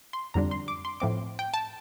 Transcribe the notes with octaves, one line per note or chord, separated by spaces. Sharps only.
C6
F2 D3 G3 D4 A#5
C6
D6
C6
A2 F3 C4 D6
G5
A5